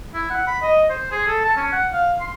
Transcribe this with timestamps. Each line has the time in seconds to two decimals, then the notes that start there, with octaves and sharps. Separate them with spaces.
0.14 E4
0.30 F#5
0.47 B5
0.62 D#5
0.89 C5
1.11 G#4
1.27 A4
1.44 A5
1.57 C#4
1.72 F#5
1.93 F5
2.20 C6